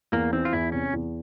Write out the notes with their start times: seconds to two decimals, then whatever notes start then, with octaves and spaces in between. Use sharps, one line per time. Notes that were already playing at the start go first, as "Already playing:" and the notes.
0.12 E2 A#3
0.33 E3 C4
0.45 F4
0.53 E2 E4
0.72 C3 C#4
0.93 E2